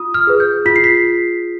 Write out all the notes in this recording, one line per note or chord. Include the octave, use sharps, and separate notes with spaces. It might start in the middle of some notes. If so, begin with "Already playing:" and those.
Already playing: F4 D#6
F6
G#4 B4
G6
F4 B6
C7
B6